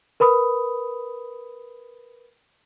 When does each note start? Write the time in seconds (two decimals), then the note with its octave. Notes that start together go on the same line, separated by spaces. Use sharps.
0.20 A#4 B4 B5 D#6